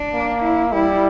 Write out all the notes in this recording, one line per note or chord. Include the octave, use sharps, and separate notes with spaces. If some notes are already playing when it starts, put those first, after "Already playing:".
Already playing: D4
A#3
E4
G3 E4